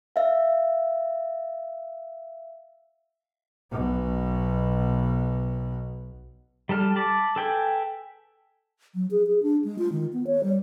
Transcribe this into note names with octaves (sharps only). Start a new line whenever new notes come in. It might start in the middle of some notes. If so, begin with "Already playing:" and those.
E5 F5
B1 B2
G3 A4 A5 F6
A5 B5 D6
A4 B4 G5 G#5
F#3
G#4
G#4
D4
G#3
F4
D#3
B3
C#5
G3